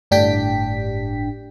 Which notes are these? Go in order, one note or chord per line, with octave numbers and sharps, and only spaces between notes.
G1 A2 D4 G4 G5 B6